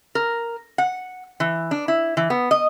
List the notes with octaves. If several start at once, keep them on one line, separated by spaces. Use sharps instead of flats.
A#4
F#5
E3
D4
E4
E3
B3
D#5